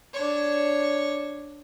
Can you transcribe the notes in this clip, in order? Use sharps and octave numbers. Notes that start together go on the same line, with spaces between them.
D4 C#5